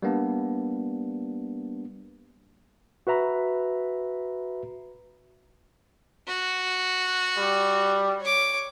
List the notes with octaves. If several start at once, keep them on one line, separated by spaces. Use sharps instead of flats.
G3 A#3 B3 D4
F#4 B4 E5 A#5 B5
F#4
G3
C#5 D6